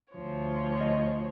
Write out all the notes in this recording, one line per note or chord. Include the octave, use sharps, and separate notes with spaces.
D2 F3 C#5
D#5